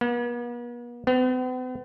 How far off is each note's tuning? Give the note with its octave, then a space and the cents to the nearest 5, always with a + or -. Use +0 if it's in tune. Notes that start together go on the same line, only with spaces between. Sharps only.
B3 -45
B3 +45